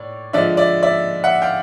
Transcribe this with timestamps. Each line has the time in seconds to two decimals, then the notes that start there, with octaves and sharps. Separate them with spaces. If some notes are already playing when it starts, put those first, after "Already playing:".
Already playing: A2 C#5 D5
0.33 D3 F3 G#3 D5 E5
0.57 D5 E5
0.83 D5 E5
1.24 E5 F#5
1.42 F5 G5